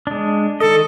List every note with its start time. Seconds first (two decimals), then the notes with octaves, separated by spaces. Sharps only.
0.07 G#3 D4
0.60 D#3 A4 D#5